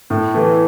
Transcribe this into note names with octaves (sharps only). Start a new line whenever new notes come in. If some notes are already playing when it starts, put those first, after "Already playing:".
A2
E3 A3